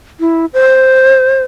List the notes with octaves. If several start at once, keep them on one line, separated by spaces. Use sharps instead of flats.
E4
C5